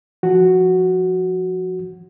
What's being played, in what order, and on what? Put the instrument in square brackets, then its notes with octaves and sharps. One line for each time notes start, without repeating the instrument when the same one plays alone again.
[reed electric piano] F3 F#4